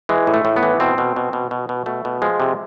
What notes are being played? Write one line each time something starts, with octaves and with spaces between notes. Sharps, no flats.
E3 G#3
A2
A3
A2
B3
E3
B2 C4
B2
B2
B2
B2
B2
B2 A3
B2
F3 G#3
C3